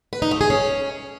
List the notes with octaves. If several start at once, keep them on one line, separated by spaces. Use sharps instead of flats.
B4
D#4
A3
G#4
C#4